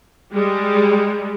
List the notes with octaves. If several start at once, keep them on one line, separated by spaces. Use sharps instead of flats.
G3 G#3